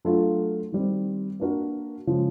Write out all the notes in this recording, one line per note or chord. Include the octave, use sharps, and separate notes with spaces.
F#3 A3 D4 F4
D#3 G3 C4
A#3 D4 F#4 A#4
C#3 F3 G#3